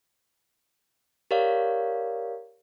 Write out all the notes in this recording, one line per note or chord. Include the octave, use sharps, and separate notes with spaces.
G4 A#4 C#5 D5 F5